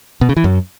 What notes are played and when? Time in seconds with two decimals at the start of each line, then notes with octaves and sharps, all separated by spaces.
0.21 B2
0.29 C#3
0.37 E3
0.44 F#2